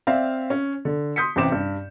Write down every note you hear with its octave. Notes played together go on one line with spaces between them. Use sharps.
C4 D5 E5 F5
C#4
D3
C6 D#6 G6 B6 C#7
A1 C3 C4 D6 E7
G2